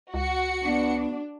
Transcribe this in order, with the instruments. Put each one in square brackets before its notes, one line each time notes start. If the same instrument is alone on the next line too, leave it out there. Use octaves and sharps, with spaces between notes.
[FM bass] C#2 [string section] F#4 C#7
[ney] B3 [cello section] D4